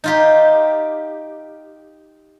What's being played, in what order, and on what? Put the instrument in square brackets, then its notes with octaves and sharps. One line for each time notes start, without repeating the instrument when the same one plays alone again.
[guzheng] D#4 F4 G4